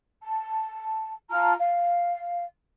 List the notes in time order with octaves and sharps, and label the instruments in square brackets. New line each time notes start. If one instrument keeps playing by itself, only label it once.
[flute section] A5
F4 A5 A#5 F6
F5